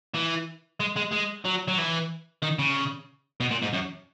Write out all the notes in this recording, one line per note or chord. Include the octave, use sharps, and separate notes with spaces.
E3
G#3
G#3
G#3
F#3
F#3
E3
D#3
C#3
B2
A#2
G#2
F#2